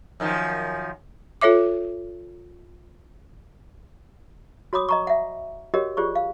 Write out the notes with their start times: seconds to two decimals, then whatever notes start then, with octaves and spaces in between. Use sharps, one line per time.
0.20 F#2 D#3 F3
1.41 F4 A4 C#5 E5 D6
4.73 F#4 C#5 B5 D6 D#6
4.89 D#5 A#5 C#6
5.07 E5 F#5
5.74 F#4 G4 A#4 C#5 D#5 F#5
5.97 F4 G4 G#4 C5 D5 C#6
6.15 F5